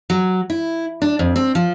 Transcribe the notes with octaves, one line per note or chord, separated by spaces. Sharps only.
F#3
E4
D4
F2
C4
F3